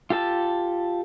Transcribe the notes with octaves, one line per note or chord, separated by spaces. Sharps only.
F4 G4 A4 A5